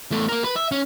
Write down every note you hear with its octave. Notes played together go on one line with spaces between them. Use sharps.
E2 A3
A#3 A#4
B4
E5
C#4